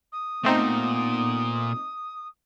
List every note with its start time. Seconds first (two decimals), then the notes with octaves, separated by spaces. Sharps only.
0.12 D#6
0.45 A#2 A3 B3 C4 D#4